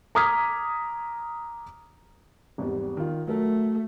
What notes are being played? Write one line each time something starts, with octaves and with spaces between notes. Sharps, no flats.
A#5 D6 D#6 F6 G#6 B6
G#1 E2 G3
D#3 F4
F#3 A3 A#4